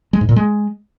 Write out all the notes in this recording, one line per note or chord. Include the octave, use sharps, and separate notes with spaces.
G#3
G#2
A#2
G#3